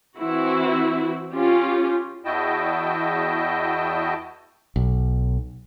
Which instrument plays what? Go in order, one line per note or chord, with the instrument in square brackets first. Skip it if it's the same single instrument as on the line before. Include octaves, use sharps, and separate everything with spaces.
[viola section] E3 C4 E4 F#4
C#4 F4 G4
[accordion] E2 E4 F#4 D#5 G5 A5
[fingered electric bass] B1